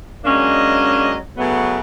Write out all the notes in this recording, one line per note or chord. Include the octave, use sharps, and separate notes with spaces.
F#3 G#3 A#3 C#4 D4 D#5
C#3 F#3 A3 B3